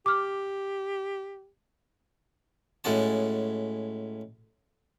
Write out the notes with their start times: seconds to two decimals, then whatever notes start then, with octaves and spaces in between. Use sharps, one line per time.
0.06 G4 D6 F6
2.84 A2 G#3 C#4 F#4 A5